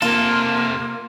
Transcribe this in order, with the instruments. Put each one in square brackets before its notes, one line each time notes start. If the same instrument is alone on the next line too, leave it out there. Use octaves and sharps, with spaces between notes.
[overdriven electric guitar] C3 A4 [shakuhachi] A#3 [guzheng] F4